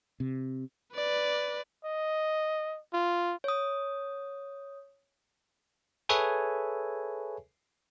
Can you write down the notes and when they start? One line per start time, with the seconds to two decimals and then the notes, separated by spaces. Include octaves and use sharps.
0.20 C3
0.95 B4 D5
1.85 D#5
2.93 F4
3.44 C#5 D#6
6.09 G#4 A4 B4 C#5 E5 G#5